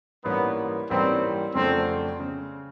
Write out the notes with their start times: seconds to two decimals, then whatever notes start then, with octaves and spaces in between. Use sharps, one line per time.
0.24 G#2 E3 G3 A#3 B3 C#4
0.90 G#2 E3 G3 A#3 C4 C#4
1.54 F2 C#3 F#3 A3 C4 D4
2.20 C#3